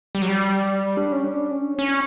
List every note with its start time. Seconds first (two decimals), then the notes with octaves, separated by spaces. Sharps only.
0.15 G3
0.22 F#3
0.29 G3
0.97 D4
1.12 C#4
1.24 D4
1.51 C#4
1.79 C#4